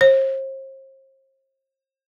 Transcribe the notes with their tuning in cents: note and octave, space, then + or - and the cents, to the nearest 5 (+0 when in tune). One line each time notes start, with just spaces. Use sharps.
C5 +40